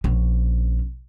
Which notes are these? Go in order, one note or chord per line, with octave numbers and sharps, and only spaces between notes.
A#1 C#4